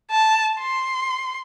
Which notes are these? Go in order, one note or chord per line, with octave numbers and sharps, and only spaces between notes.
A5
C6